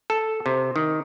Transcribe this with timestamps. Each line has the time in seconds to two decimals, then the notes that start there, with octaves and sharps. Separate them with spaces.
0.10 A4
0.46 C3
0.76 D#3